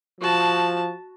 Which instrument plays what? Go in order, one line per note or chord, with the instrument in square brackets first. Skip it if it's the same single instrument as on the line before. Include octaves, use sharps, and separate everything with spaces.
[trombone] F3 [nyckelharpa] F#4 A5